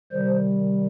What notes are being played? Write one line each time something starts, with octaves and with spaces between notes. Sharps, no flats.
C3 D#3 G3 C5